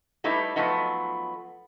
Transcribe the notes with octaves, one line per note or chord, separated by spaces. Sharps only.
G3 A3 D#4 E4 B4
F3 F#3 A3 B3 D#4